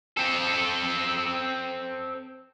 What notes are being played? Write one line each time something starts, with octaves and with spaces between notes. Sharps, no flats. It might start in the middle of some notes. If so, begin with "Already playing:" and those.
C4 A4